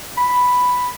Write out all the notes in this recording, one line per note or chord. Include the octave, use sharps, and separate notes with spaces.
B5